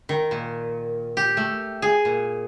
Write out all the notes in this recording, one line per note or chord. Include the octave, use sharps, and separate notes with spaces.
D#3
A#2
G4
A3
G#4
A#2